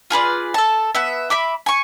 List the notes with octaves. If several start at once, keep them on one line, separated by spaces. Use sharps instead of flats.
F4 G#4 B4 D5
A4 A5
B3 E5
E5 B5 D6
G#5 C#6